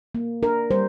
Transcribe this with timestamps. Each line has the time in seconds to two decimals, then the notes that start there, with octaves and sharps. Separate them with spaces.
0.15 A#3
0.42 D4 A#4
0.70 G3 C5